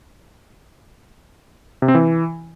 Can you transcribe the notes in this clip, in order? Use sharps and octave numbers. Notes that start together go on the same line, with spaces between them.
C3
C4
E3